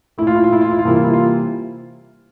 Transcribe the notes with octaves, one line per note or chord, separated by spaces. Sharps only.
A#2 A3 E4
F4
E4
F4
E4
F4
E4
F4
C3 E3 G3 A#3 E4
F4
E4
F4